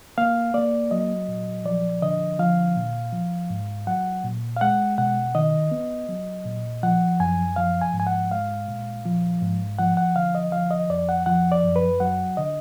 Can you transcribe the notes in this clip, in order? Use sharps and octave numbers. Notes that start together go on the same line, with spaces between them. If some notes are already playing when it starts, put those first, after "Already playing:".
A#3 F5
A#3 D5
F#3 D#5
A#2
F3 D5
D3 D#5
F3 F5
A#2
F3
G#2
F#3 F#5
A#2
F5
G#3 F#5
B2 F#5
D#3 D#5
B3
F#3
A#2
F3 F#5
F#2 G#5
F3 F5
G#5
G#2
G#5
F#5
G#3 F5
A#2
F3
G#2
F3 F#5
F#5
D3 F5
D#5
F3 F5
D#5
F2 D5
F#5
F3 F#5
D5
F#2
B4
F#3 F#5
D3 D#5